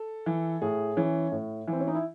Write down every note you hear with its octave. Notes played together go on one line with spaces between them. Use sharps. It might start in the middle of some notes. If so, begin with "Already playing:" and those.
Already playing: A4
E3
A2 G#4
E3 C#4
A2
E3 C4
C#4
D#4
E4